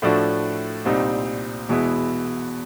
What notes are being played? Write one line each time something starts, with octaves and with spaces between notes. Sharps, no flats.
A2 F3 A3 D4 F#4
C2 A#2 G3 C4 D#4
E2 B2 G#3 B3 E4